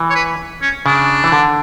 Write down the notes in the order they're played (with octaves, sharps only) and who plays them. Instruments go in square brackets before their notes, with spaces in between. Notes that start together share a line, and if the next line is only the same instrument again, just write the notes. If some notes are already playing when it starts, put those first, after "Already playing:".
Already playing: [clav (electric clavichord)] E3
[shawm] C#5
B4
C#4
[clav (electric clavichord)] C#3 [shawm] D4
[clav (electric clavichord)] E3
D3